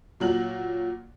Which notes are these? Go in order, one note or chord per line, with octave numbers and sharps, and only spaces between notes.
A#2 F#3 F#7